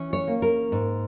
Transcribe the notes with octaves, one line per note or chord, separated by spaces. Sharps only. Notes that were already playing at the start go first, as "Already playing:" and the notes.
Already playing: E3 C#4
C#5
A#3
A#4
G#2